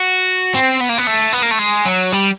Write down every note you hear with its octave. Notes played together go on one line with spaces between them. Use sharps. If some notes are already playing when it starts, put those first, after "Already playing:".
Already playing: F#4
C4
B3
A#3
B3
A3
B3
A#3
A3
G#3
F#3
G3